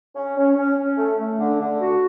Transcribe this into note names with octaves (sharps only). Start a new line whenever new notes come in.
C#4
C#4
C#4
C#4
A3
A3
D3
D3
F#4